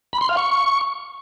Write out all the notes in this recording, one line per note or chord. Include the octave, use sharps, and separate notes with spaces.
B5
C6
F5
C#6